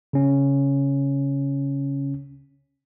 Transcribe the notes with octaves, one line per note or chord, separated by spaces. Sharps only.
C#3 C#4